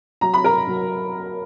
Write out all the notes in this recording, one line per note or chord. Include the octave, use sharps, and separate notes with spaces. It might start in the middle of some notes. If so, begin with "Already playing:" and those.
F#3 A#5
B5
A#4 A#5
F#3